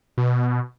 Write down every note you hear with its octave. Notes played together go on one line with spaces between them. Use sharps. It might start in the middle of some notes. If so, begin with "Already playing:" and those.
B2